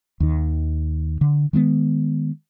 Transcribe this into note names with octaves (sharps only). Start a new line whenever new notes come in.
D#2 D#3
D3
D#3 G#3 A3 B3